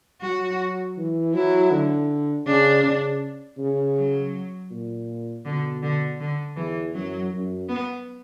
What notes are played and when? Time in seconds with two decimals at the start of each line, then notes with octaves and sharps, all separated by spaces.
0.22 F#3 F#4
0.97 E3
1.34 F#3 E4
1.71 D3
2.46 C#3 D4
2.83 C#3
3.58 C#3
3.95 F#3
4.71 A#2
5.45 B2 D3
5.82 D3
6.20 D3
6.56 E2 E3
6.94 F#2 F#3
7.32 F#2
7.69 B3